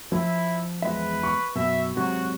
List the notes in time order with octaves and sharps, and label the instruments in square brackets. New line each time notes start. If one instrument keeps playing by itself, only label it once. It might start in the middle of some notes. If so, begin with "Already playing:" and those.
[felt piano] F3 [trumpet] E4
[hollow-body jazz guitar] E2 G#3 E5 [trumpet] B4
[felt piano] C#6
[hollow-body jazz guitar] F#2 B2 [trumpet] E5
[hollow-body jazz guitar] G#2 C3 F#3 [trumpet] F#4